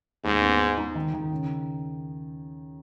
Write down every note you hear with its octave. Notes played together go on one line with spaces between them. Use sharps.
D#2 G#2
B3
D#4
D#4
D#3
D#3
C#3